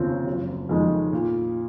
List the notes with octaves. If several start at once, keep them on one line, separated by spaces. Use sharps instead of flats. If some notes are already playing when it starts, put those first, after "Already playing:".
Already playing: F1 D#2 C#3 F3 C4
F#1
F2 D#3 G#3
A#2